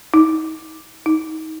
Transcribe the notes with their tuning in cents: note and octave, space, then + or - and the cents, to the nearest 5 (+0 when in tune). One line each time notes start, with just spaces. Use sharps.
D#4 +35
D#4 +30